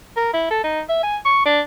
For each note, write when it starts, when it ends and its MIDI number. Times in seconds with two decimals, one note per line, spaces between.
0.17 0.33 70
0.33 0.48 64
0.51 0.60 69
0.64 0.81 63
0.89 1.02 76
1.03 1.17 80
1.25 1.44 85
1.46 1.61 62